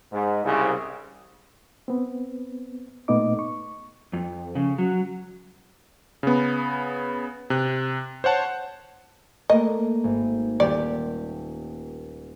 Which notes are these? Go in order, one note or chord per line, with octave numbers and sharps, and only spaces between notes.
G#2
C2 C#3
B3 C4
A#2 A3 B3 D#4 D#5 D6
C#6
F2
C#3
F#3
C#3 B3
C3 F#6
C5 C#5 F#5 A5
A3 A#3 D#5
G#1
D#1 G4 D5